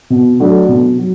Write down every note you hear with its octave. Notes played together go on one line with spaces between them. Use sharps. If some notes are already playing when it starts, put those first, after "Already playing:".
B2
F#3 A3 D4
B2
F#3